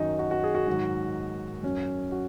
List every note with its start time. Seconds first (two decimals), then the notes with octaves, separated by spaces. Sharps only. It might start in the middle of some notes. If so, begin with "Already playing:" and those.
Already playing: F#2 D#3 F#3 D#4
0.19 F#4
0.31 F#4
0.44 G#4
0.55 F#4
0.67 G#2 D#3 F#3
1.63 F#2 F#3 C#4
2.12 F#4